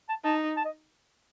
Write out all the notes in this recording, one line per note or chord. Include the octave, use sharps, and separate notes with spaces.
A5
D#4 A5
A5
D#5